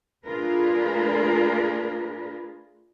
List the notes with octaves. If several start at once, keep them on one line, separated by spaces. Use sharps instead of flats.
A3 D4 F4 G#4 A#4 B4